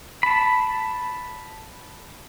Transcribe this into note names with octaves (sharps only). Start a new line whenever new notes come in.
A5 B5